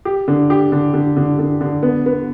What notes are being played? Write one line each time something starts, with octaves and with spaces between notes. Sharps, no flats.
G4
D3
G4
D3
D3
D3
D3
D3
B3
B3